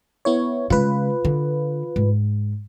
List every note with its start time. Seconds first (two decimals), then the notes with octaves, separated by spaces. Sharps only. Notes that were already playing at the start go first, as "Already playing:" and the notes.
0.25 B3 E4 C#5
0.70 C#3 G#3 F4 B4
1.25 D3
1.96 G#2